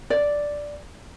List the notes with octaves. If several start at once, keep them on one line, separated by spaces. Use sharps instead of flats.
D5